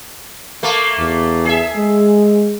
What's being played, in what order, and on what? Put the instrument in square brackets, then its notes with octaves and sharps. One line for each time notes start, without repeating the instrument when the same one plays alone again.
[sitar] A3 A#3
[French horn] E2
[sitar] G#4 E5
[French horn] G#3